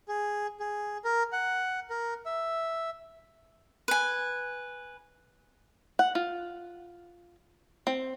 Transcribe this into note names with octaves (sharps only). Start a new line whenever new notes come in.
G#4
G#4
A#4
F#5
A#4
E5
B4 G#5
F#5
F4
C4